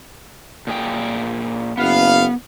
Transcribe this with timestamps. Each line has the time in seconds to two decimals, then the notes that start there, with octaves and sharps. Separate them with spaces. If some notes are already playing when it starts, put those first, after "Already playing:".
0.67 A#2 G#4 G5
1.77 F#1 B3 F5